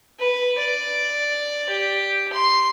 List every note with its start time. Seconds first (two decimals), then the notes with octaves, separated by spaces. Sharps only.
0.19 B4
0.58 D5
1.69 G4
2.33 C6